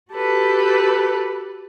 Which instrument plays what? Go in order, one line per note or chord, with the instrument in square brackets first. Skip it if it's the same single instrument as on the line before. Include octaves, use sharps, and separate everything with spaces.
[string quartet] F#4 G4 A4 B4